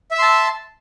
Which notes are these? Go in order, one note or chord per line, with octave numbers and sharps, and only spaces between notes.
E5 A5 C6 E6